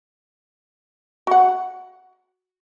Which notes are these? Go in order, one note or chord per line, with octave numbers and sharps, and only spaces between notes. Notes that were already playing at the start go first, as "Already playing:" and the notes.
F#4 F#5